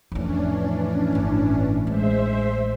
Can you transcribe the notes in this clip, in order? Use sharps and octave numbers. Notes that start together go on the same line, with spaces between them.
F2 A2 E3 C#4 D4
G1 A2
A1 G#3 C5 E5